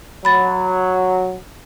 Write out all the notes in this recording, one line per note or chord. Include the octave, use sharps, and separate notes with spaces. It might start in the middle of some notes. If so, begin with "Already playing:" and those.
F#3 B5 A6